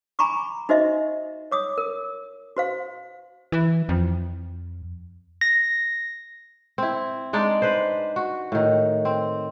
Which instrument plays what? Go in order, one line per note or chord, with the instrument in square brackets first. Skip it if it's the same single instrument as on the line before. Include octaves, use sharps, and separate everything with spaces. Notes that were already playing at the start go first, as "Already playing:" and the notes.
[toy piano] G#5 A#5 B5 C#6 D6
D#4 F#4 C5 D#5 E5
C#5 D6 D#6
A#4
F#4 C5 F5
[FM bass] E3
F2
[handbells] A#6
[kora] C4 E4
G#3 D4 D#4 D5
B4 C5
F#4
A2 D#3
C4